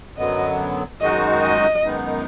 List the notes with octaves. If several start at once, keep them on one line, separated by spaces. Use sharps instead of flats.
F#2 D3 F#3 B3 D#5
F#2 D#3 G#3 D#4 F#4 D#5
D#5
F#2 D#3 G#3 B3 D#4